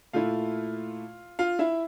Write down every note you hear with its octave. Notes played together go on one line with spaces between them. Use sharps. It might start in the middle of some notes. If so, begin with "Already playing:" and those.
A#2 A3 E4 F4 F5
F4 F5
E4 E5